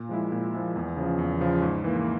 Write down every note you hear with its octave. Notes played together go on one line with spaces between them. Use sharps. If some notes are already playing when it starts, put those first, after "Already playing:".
Already playing: A#2
F3 G#3 E4
A#2
F3 G#3 E4
E2
C#3 F3
E2
C#3 F3
G#2
E3 A#3